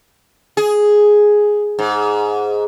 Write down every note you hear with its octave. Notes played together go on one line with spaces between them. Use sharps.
G#4
G#2